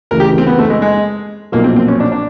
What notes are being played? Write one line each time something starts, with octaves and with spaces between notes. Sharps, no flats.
D2 C#3 E3 A#4
G4
C4
B3
A3
G#3
G#3
B1 A#2 F3 A#3
C4
C4
C#4
D4
D4